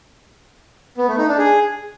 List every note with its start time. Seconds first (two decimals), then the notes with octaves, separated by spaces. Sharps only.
0.98 B3
1.08 A3
1.18 D#4
1.28 D4
1.38 G#4